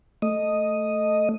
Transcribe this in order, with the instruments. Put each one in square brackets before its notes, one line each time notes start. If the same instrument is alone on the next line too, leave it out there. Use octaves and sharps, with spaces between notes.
[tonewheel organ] A3 D#5